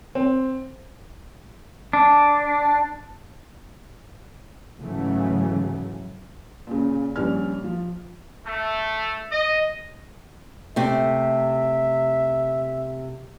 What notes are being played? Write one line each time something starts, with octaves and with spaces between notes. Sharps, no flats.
C4
D4
G#2 C#3 E3 F#3 A3
A#2 C#3
A#1 G3 C#4 F6
F3
A3
D#5
C3 A3 E5